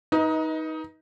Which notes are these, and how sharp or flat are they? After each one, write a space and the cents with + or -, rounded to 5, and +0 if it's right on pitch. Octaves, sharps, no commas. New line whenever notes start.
D#4 +15 B4 -20 D#5 +30